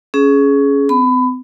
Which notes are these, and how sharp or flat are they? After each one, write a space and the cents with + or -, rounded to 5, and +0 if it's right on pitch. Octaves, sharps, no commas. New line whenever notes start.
C#4 +10 G#4 +20
C4 -45 B5 +25